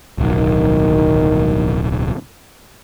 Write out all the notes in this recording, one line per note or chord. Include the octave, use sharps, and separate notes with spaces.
D1 B1 D#3